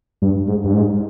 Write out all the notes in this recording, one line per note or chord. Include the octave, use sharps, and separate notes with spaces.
G2
G#2
G2
G#2